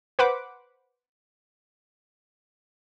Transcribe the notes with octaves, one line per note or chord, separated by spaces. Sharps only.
B4 C5 F#5 B5 D6